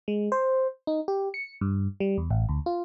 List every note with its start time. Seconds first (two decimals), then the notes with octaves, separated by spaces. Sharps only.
0.08 G#3
0.32 C5
0.87 D#4
1.08 G4
1.34 C#7
1.61 G2
2.00 G3
2.18 E2
2.30 A1
2.49 D2
2.66 F4